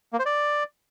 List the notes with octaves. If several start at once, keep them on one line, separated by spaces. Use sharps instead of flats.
A#3
C5
D5